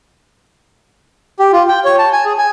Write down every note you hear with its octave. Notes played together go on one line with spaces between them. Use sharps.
G4
F4
G5
C#5
A5
G#5
G#4
G#5